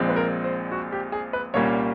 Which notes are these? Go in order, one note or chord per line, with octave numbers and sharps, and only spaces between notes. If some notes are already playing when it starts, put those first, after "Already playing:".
Already playing: A#1 A#2 F3 G#3 C4
B4
A#4
C5
F#4
G4
G#4
B4
C2 A#2 G3 A#3 C#4 C#5